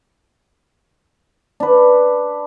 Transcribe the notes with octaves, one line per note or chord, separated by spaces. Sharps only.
D4 B4